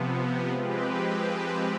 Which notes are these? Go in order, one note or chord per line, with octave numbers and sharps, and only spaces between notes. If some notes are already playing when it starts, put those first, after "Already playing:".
Already playing: C3 F3 B3
F3 G#3 C4 G4 B4